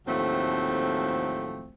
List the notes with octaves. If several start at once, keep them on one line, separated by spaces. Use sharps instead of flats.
D#2 A2 F3 F#3 A3 C4